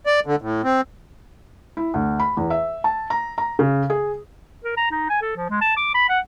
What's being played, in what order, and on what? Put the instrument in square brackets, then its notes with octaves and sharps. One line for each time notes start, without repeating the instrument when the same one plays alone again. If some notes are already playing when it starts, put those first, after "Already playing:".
[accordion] D5
D3
A2
C4
[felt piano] E4
D2
B5
E2
E5
A5
A#5
A#5
C#3
G#4
[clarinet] A#4
A#5
D#4
G#5
A4
F3
G#3
A5
D6
B5
F#5